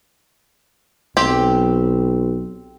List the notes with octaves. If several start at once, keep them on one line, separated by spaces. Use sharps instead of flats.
B1 C4 G4